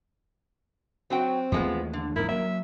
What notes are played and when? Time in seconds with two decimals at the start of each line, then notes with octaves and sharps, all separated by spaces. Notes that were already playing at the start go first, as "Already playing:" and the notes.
1.10 F#3 C4 F#4 G5
1.52 D#2 E3 F3 G#3 A3 B3
1.93 D3
2.16 E2 G#2 D3 E4 A#4
2.28 F#3 A#3 E5